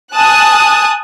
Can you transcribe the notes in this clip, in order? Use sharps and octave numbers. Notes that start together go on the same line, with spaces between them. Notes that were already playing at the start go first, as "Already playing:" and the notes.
G#5 A5 D#6 F#6